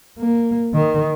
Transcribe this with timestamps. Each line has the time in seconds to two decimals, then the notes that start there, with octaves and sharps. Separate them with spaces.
0.19 A#3
0.74 D#3